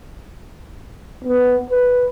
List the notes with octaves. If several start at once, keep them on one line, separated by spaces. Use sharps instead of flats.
B3
B4